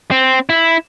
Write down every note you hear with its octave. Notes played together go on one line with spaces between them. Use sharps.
C4
E4